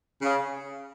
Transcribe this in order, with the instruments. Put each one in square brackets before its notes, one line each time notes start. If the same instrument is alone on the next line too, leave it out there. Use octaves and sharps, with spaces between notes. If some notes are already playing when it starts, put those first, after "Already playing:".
[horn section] C#3